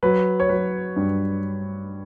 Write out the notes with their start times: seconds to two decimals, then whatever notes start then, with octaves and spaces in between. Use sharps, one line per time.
0.03 F#3 B4
0.40 C#5
0.49 F#3 B4
0.96 G2